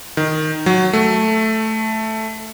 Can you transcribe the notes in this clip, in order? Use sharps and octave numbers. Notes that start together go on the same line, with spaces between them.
D#3
F#3
A3